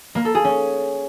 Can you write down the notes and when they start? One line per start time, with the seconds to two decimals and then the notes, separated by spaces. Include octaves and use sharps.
0.15 A#3
0.25 A4
0.35 G#4
0.44 C#4